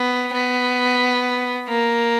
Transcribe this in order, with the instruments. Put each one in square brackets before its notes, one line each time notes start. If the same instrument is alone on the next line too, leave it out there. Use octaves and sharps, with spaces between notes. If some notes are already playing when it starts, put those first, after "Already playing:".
Already playing: [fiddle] B3
B3
A#3